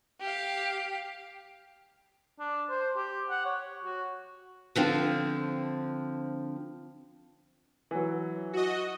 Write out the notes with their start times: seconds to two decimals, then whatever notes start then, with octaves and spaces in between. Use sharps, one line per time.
0.21 G4 F5
2.40 D4
2.69 C5
2.97 G4
3.30 F#5
3.45 C#5
3.85 F#4
4.75 D3 F3 C4
7.91 E3 F#3
8.53 F#4 D#5